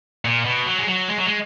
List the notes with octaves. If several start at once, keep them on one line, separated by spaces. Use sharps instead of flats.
A#2
B2
F#3
G#3
F#3
G#3
F#3
G#3